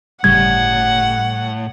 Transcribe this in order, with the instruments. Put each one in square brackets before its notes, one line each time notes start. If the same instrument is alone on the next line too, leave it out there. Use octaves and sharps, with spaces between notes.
[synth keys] G1 C#3 G3 [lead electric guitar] A2 [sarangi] F#5 [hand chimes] G#6